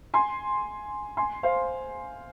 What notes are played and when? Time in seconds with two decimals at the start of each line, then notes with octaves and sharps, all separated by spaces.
0.14 G#5 C6
1.17 G#5 C6
1.43 C5 F5